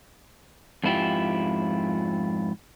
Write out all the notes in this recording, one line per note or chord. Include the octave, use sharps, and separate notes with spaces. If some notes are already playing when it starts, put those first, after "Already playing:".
F2 G#2 E4 F4 G4